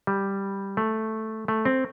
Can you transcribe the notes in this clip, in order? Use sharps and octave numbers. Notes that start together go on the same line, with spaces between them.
G3
A3
A3
C4